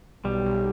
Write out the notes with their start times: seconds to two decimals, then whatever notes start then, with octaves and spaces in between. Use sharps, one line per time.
0.24 B1 G3
0.46 B1